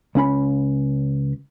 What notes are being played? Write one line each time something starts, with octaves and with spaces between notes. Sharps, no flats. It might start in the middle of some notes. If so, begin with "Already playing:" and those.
C#2 C#4 B5